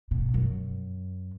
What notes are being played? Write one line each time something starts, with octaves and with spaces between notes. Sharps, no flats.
B2
F#2